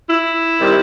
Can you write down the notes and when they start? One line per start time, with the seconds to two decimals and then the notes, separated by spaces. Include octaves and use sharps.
0.08 E4
0.59 C3 D#3 G3